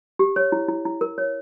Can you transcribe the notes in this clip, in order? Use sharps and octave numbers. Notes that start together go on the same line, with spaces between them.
G4
C#5
E4
E4
E4
A#4
C#5